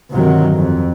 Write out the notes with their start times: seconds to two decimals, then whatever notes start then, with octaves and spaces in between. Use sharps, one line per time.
0.11 G1 C3 D#3 F#3
0.54 F2